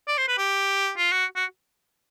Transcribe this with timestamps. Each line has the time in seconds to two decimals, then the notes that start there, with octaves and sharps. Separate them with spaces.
0.08 D5
0.18 C5
0.28 B4
0.38 G4
0.97 F4
1.12 F#4
1.36 F#4